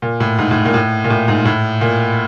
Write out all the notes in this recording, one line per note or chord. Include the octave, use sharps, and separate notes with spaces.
A#2
A2
G#2
A2
A#2
A2
A#2
A2
G#2
A2
A#2